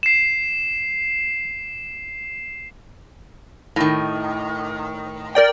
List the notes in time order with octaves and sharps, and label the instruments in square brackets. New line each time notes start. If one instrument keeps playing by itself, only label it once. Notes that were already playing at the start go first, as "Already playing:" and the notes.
[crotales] C7 E7
[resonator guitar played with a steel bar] A2 D#3
[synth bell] A#4 D5 G5